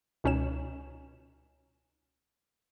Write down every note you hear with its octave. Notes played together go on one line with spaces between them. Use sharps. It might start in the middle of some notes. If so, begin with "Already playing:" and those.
C#2 B2 C#4 D#4 C#5 E7